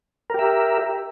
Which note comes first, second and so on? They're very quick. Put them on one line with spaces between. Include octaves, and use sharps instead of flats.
A#4 G4 E5